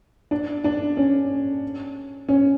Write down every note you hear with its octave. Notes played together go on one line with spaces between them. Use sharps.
D4
D4
C#4
C#4